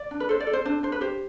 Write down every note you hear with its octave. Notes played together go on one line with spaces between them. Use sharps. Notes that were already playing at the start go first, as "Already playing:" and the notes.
Already playing: D5
D4
B4
A4 C5
D5
A4
C5
D4 C5
D4 C5
B4
G4 C5